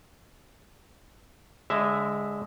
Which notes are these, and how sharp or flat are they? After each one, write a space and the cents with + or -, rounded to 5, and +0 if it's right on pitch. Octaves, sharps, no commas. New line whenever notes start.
D3 -30 G#3 -10 E5 +0